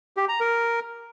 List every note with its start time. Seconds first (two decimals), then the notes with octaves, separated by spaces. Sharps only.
0.17 G4
0.29 A#5
0.40 A#4